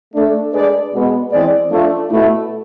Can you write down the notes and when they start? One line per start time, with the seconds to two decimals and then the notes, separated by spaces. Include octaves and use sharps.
0.14 A3 D4 A4
0.53 G#3 D4 G#4 B4 D5
0.93 B2 G#3 B3
1.31 E3 G#3 C4 G#4 D5
1.71 F3 A3 D4
2.10 B2 A3 E4